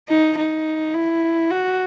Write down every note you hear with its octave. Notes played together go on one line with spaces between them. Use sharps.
D#4
D#4
E4
F#4